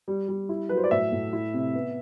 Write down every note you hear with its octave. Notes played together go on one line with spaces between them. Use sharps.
G3
G3
E4
F#3 B4
C5
D5
A2 E5
A2
E4
C3
B3